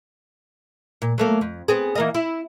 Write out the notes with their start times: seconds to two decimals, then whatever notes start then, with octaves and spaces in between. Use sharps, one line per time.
1.02 A#2
1.18 F#3 A3 A#3
1.41 F2
1.68 B3 C4 G#4
1.95 E3 A#3 D#5
2.15 E4